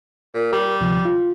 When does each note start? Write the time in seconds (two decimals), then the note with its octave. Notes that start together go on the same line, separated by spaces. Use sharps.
0.35 A#2
0.52 G3 A#4
0.81 D2 C3 F3
1.05 F4